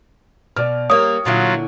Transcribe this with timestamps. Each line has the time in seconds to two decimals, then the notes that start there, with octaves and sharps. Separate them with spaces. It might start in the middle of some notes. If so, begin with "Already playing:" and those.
0.56 B2 D5 F6
0.90 G3 A#3 C#5 D#6
1.25 A#2 D3 F#3 E4 F4